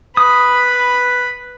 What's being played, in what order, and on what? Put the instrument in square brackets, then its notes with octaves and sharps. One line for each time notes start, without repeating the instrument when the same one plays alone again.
[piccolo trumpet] B4 [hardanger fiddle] B5 [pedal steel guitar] D#6